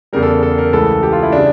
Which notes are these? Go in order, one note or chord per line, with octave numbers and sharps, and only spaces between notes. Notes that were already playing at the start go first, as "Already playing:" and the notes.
E2 C#3 G3 A#4
A4
A4
A#4
C#2 C#3 E3 A3 A4
G4
F4
E4
C#3 G3 D4